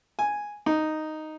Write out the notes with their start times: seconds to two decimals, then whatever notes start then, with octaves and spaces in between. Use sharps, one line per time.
0.19 G#5
0.66 D#4